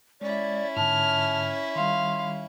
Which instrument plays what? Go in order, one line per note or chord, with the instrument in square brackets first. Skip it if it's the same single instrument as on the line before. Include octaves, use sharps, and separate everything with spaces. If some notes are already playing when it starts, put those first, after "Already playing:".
[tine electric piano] G#3 [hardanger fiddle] C#4 E4 [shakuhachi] D5
[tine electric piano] G#2 D3 [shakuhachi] A5 [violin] F6
[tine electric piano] D#3 G3 [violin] F5 [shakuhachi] C6